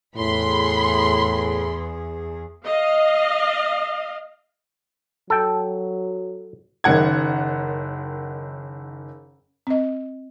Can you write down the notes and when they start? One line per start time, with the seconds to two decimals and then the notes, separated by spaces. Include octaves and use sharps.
0.17 E2 A2 G#4 B5 C6
2.64 D#5 F5
5.30 F#3 A4 G5
6.84 F#1 F#2 D#3 F#5 G#6
9.67 C4 D#5